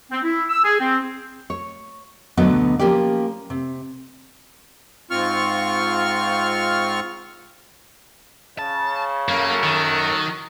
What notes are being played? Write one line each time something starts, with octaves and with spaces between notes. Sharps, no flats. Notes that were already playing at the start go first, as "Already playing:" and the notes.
C4
E4
E6
G#4
C4
C#5
D2 B2 D3 F#3 B3 D#5
F3 A#3 C#4 G4 D5
C3
G#2 C4 F4 C#6 F6
C#3 A5
F#2 A#3 C#4 F#4 A4 A#4
D#3